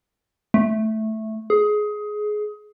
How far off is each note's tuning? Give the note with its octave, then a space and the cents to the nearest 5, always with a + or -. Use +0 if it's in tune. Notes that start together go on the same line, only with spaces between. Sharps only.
A3 -5
G#4 +15